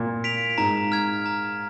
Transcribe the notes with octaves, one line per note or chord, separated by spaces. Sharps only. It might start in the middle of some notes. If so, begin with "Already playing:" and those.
Already playing: A#2
B6 D7 F7
G#2 A#5
F6 G#6
A#5